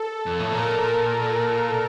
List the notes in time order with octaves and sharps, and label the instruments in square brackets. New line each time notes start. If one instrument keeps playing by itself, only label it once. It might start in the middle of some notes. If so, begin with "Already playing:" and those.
Already playing: [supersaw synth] A4
[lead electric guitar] F2
A2
[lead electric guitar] A#2 [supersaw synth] A#4